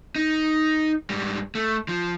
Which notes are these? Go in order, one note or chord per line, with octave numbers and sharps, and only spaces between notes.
D#4
G#2 G3
A3
F3